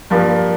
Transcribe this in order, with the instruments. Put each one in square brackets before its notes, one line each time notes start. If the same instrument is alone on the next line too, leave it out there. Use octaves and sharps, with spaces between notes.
[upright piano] G2 F3 A#3